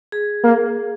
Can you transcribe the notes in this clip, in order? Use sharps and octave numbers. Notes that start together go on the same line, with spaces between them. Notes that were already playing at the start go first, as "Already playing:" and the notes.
G#4
A#3